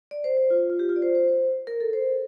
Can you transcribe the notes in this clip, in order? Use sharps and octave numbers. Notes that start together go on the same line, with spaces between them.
D5
C5
C5
F4
F4
G4
F4
D5
C5
C5
C5
A#4
A4
C5